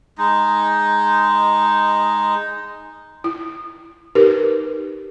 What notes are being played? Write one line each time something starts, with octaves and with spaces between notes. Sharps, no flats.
G#3 D#4
E4
D#4 G4 A#4 B4